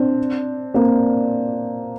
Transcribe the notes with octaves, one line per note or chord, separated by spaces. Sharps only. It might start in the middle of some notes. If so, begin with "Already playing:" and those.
Already playing: C4 D4
A#3 C4